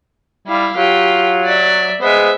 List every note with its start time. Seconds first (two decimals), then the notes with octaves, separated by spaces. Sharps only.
0.47 G3 E4 F5
0.77 F#3 F4 G4
1.44 D5 E5
2.01 G#3 B3 C5 E5